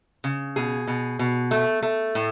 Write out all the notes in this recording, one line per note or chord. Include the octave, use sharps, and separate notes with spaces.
C#3
B2 G#4
B2
B2
A3
A3
A2